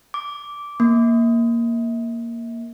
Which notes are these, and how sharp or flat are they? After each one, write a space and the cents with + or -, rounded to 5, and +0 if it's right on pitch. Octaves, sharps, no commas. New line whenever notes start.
D6 -10
A#3 +0